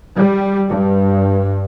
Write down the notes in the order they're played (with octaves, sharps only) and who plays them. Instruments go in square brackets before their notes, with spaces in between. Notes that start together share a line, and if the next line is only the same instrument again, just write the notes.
[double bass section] G3
G2